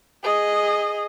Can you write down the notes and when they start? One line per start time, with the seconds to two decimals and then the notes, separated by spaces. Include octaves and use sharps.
0.24 G#4 D#5